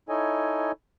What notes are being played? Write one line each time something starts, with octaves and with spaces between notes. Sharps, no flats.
D#4 E4 A4 C#5 D#5 G#5